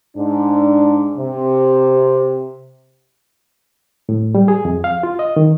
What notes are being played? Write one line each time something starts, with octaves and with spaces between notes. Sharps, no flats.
G#2 D4
C3
A2
G3
G#4
F2
F5
F4
D#5
D#3